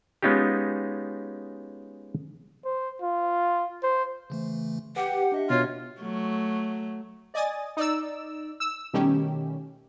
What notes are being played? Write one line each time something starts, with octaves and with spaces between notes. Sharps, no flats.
G#3 B3 C#4 D#4 F4 G4
C5
F4
C5
C#3 E3 A3
G4 B4 F#5
D4 D#5 E5
B2 F4 C#5
F#3 A3
D5 D#5 G#5 D#6 A6
D#4 D5 E6
E6
B2 D#3 G3 A3 C#4 G4